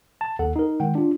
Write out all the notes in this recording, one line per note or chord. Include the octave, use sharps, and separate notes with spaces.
A5
D#2 A4 F#5
D#4 A#4
D#3 G#3 F#5 G5
D4 F4